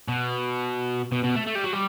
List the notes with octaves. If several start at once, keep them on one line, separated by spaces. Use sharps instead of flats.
B2
B2
B2
A3
A3
G3
F#3
G3